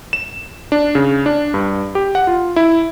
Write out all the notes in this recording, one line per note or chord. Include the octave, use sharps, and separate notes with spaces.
E7
D4
C#3
D4
G2
G4
F#5
F4
E4